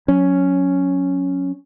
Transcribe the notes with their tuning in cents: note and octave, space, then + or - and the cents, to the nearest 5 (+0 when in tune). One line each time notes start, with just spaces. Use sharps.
F#3 -20 C#4 +0